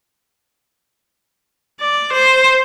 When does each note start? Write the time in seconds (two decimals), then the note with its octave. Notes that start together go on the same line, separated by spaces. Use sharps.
1.81 D5
2.13 C5